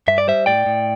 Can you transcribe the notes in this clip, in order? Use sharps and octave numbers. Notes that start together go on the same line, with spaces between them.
G2 E5
D5
G3 C5 E5
A2 D5 G5
A2